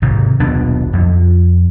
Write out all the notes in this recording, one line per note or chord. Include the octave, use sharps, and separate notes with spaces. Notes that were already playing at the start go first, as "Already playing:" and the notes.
G#1 G#2 C3 D#3
D#1 B1 B3 D4
F2